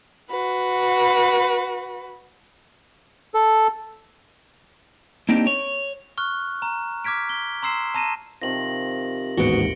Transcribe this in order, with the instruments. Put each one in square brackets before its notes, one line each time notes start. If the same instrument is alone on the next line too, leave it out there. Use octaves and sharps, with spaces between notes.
[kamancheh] F#4 B4
[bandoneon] A4
[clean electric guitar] A#3 C4 D4 D#4 G4
C#5
[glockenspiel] C#6 F6 F#6
A#5
D6 F6 G#6 B6 D7
G7
A#5 C6 E6 C7 E7
A5 A#5 A#6 D#7 E7
[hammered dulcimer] C3 D#3 F3 [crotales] A#6 F#7
[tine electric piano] A1 D#2 G#2 [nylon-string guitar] B3 F#4 [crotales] C#7 D7 G7